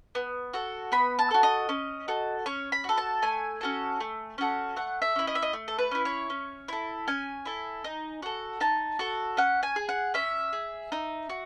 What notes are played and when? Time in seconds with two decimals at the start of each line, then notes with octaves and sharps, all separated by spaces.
0.15 B3
0.53 F#4 A4
0.92 B3 B5
1.19 A5
1.31 F#4 A4
1.43 D#5
1.69 C#4
2.08 F#4 A4
2.46 C#4 C#5
2.72 B5
2.84 F#4 A4
2.98 A5
3.22 A3 G#5
3.61 C#4 F#4 A4
4.00 A3
4.38 C#4 F#4 A4
4.76 A3 F#5
5.02 E5
5.16 C#4 E4
5.27 D#5
5.35 E5
5.42 D#5
5.53 A3
5.68 A4
5.79 B4
5.91 C#4 E4
6.05 C#5
6.30 C#4
6.68 E4 A4
7.08 C#4 G#5
7.45 E4 A4
7.84 D#4
8.22 F#4 A4
8.60 D#4 A5
8.99 F#4 A4
9.37 C#4 F#5
9.63 G#5
9.76 G#4
9.89 F#5
10.14 C#4 E5
10.53 G#4
10.92 D#4
11.30 F#4